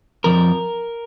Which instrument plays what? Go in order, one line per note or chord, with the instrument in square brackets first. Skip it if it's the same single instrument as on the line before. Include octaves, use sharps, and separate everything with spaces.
[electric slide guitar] F2 F3 A#4